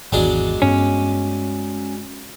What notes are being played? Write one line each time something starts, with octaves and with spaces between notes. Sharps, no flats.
G#1 E2 F#3 G#3 D4
G2 B3 C#4